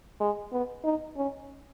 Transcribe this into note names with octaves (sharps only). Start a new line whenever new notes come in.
G#3
B3
D#4
C#4